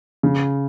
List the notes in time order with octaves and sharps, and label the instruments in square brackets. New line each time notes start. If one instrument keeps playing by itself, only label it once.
[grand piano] C#3